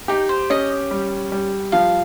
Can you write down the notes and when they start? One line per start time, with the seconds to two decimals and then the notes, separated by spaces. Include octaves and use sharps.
0.08 D#4 G4
0.29 C5
0.50 C#4 D#5
0.91 G3
1.32 G3
1.72 F3 F5